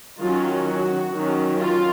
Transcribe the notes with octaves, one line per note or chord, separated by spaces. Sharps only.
D#3 F#3 C#4 F4
F#4
D#3 F#3 C#4
F4